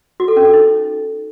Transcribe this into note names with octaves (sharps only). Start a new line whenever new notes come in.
F#4
A4
C#4
A4
D#4